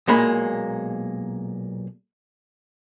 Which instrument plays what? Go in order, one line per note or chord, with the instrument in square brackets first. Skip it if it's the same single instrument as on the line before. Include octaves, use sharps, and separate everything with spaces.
[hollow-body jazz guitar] B1 A#2 G#3 A#3 B5